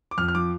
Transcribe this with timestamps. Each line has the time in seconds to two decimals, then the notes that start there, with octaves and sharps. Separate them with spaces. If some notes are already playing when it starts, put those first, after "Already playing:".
0.11 D6
0.18 F2 F6
0.28 F6
0.35 F3 D6